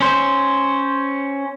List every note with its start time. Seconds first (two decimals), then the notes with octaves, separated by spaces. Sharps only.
0.01 C#4 C5